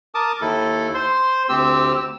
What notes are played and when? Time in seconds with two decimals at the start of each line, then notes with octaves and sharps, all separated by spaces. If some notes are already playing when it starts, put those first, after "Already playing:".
0.15 A#4 A5 D6 D#6
0.41 D#2 E4 A4
0.94 C5 C6
1.49 D2 C4 G4 E6